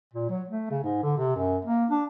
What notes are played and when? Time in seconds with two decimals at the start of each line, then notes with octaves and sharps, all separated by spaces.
0.13 A#2
0.29 F#3
0.48 A3
0.70 C#3
0.83 G#2
1.03 D3
1.18 C3
1.35 F#2
1.65 A#3
1.90 D4